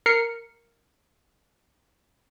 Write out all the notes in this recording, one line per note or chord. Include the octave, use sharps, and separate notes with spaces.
A#4 C7 C#7